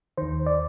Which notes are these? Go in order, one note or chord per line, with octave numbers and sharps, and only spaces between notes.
D#2 D#3 C5
D5